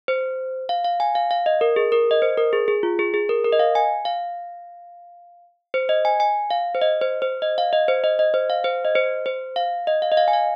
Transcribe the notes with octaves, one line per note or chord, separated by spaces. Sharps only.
C5
F5
F5
G#5
F5
F5
D#5
A#4
G#4
A#4
D#5
C5
A#4
G#4
G#4
F4
G#4
G#4
A#4
A#4
D#5
F5
G#5
F5
C5
D#5
G#5
G#5
F5
C5
D#5
C5
C5
D#5
F5
D#5
C5
D#5
D#5
C5
F5
C5
D#5
C5
C5
F5
D#5
F5
D#5
F5
G#5
F5